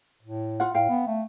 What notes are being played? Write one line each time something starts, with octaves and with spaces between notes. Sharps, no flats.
A2
F4 F#5
A2 F5 G5
B3
A3